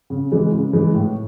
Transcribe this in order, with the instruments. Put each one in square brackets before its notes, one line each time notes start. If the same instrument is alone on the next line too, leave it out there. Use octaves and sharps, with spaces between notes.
[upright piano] C#3
E3 G#3
C#3
E3 G#3
A2